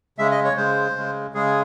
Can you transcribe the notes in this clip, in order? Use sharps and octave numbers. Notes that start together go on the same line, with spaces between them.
C#3 G#3 E5
D#5
C#5
C#3 G#3 C5
C#3 G#3
C#3 G#3 G#4